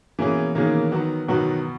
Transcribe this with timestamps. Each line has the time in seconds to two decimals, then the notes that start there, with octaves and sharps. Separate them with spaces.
0.19 B2 E3 A#3 C#4 G#4
0.55 B2 D#3 A#3 C#4 G#4
0.92 D#3 F#3 B3 F#4
1.28 B2 D#3 F#3 B3 F#4